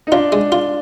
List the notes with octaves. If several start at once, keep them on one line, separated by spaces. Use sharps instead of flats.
D#4
D4 F4
G#3
F4